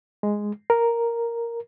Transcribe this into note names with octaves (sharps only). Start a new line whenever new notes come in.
G#3
A#4